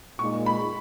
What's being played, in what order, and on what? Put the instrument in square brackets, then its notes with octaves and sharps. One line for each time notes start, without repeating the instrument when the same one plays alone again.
[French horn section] A#2 G#3 D#4 [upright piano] C#6
[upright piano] B5